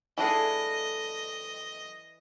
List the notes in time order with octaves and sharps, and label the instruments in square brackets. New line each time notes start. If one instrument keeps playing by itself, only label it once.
[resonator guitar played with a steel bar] F#2 A#3 A4 [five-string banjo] E3 D4 G#4 [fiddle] D#5